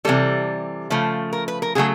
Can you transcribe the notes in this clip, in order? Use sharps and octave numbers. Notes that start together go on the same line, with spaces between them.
C3 E3 G3 A4
C#3 F3 A3
A#4
B4
A#4
C#3 F#3 A3 G#4